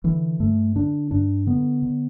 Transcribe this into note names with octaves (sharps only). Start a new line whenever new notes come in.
D3 E3
G2 A3
D3 D4
G2 D4
D3 B3
D3